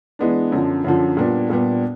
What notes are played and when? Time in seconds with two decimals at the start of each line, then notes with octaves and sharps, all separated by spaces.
0.19 E3 G#3 B3 D4
0.52 F#2 D3 F3
0.84 F#2 D3 F3
1.17 A#2 G3 B3 D4
1.50 A#2 G3 B3 D4